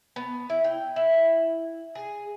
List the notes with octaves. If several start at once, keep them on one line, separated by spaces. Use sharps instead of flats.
B3
E4
G5
E4
G#4